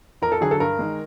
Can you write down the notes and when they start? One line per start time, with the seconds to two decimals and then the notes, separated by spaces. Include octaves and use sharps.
0.22 F2 A#4
0.32 A4
0.41 D3 F#3 G#4
0.51 A4
0.60 G2 A#4
0.79 D#3 G#3